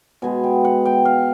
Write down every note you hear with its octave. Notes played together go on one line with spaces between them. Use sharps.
B2 G#3 B3 G#5
G5
F#5
G5
F5